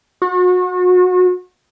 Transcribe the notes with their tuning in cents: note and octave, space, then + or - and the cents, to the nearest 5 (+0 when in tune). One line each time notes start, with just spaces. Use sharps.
F#4 -30